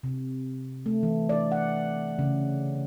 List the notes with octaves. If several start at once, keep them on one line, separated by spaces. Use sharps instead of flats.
C3
A3
E3
D5
F#5
C#3